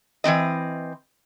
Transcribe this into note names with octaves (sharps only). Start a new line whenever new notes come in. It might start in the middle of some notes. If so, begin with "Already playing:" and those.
E3 F3 C4 D#5